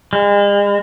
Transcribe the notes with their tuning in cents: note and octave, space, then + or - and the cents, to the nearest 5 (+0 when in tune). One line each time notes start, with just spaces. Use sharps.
G#3 -40